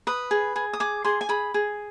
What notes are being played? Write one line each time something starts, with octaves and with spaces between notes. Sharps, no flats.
B4 D#6
G#4
G#4
D#6
G#4 D6
G#4 C6
G#5
G#4 B5
G#4